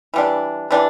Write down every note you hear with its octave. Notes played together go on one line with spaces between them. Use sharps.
E3 G3 D4
E3 G3 D4